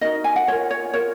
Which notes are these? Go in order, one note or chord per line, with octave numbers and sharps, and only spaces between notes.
D#4 F#4 A#4 D#5
G#5
F#5
F4 A#4 C#5
C#5
F4 A#4 C#5